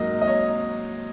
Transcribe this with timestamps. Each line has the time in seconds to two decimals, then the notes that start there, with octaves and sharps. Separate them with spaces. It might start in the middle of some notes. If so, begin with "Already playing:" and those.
Already playing: G#2 F#3 A#3 D#5
0.21 D#5
0.28 C#5